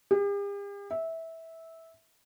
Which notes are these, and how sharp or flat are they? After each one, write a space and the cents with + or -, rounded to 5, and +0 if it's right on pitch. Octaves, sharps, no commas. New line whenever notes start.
G4 +45
E5 -15